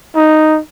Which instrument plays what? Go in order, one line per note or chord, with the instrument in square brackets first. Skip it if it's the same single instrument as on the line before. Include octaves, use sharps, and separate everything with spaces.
[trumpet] D#4